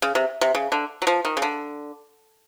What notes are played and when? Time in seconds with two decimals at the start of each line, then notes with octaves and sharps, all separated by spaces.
0.02 C#3
0.15 C3
0.41 C3
0.55 C#3
0.72 D3
1.02 F#3
1.07 F3
1.25 D#3
1.37 C#3
1.42 D3